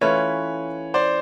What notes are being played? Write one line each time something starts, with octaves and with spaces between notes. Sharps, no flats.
E3 A3 C#4 F4 B4 C#5
C5 D5